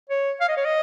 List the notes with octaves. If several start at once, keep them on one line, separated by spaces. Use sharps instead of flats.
C#5
F5
D#5
C#5
D#5